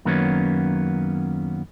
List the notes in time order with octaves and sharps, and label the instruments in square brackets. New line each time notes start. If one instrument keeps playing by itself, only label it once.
[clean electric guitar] F#2 D#3 F#3 A#3 B3 C#4